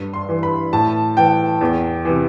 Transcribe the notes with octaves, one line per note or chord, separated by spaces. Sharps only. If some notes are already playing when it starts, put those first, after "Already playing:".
Already playing: G2
C6
E3
B5
A2 A5
E3 G5
E2
C3 E3